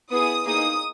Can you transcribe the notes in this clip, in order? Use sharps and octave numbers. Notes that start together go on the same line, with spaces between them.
B3 E4 G#4 D#6
A#3 D#4 G#4 D#6